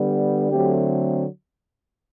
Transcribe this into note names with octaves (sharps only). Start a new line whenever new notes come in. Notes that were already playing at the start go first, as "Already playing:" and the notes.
Already playing: D3 G3 B3
D3 F#3 A3 C4 G4